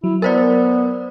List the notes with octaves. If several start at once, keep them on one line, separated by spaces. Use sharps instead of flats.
F#3 E4
B3 A#4 C5 D5